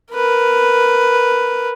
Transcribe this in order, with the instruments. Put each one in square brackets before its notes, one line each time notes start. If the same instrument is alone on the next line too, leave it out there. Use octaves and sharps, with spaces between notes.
[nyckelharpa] A#4 B4